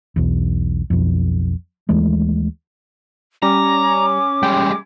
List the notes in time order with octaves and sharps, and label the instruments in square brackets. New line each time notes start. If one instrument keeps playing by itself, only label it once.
[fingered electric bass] B1 E2
B1 F2
D#2 E3 G#3 A3
[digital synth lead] G3 [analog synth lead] C#4 [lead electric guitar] A#5 [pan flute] D6
[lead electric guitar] G3 G#3 [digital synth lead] G5